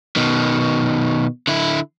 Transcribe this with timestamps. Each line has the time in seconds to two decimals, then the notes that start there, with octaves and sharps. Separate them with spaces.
0.16 B2 D#3
1.47 D3 E4